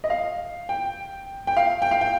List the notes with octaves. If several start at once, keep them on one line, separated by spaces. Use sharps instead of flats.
D#5
F5
G5
G5
F5
G5
F5
G5